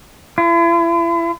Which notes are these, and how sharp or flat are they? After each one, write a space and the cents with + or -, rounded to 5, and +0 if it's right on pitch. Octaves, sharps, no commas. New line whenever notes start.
E4 +40